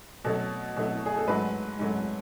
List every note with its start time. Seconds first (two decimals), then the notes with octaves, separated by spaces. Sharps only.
0.25 B2 F#3 A3 A4
0.76 B2 F#3 A3
1.06 G#4
1.17 A4
1.27 G#2 F#3 A3 B4
1.79 G#2 F#3 A3